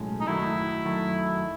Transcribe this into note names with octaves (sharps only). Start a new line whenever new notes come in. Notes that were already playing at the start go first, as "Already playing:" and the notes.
Already playing: B1 A2 G#3 C#4
D#4
F#2 D#3 F#3 A3 E4
F#2 D#3 F#3 A3